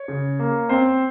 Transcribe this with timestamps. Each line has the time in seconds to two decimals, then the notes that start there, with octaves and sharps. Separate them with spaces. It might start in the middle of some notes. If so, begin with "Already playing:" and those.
Already playing: C#5
0.08 C#3
0.39 A#3
0.69 C4 C5